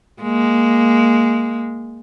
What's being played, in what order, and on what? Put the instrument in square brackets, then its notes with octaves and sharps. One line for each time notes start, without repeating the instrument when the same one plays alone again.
[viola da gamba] G#3 A#3